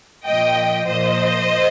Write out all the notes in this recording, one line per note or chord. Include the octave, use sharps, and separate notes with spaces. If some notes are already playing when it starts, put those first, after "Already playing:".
A#2 F3 D#5 G5
A#2 F3 C5 D#5